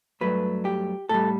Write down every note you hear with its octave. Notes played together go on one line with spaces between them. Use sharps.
G2 F#3 A3 B4
G4
A2 G3 A4